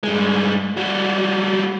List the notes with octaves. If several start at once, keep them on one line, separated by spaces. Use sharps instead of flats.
G2 G#3
G3 F#4